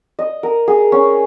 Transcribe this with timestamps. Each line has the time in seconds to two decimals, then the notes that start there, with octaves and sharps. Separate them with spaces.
0.19 D#5
0.43 A#4
0.68 G#4
0.92 C#4